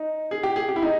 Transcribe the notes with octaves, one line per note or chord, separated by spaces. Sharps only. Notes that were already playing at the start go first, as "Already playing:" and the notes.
Already playing: D#4
G#4
G4
G#4
G4
E4
D#4